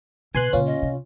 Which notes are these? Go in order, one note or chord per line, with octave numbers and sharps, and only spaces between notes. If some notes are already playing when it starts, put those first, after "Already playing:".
B2 B4 G#5 C6 F#6
A#2 C#3 C#4 F4
D#5
C3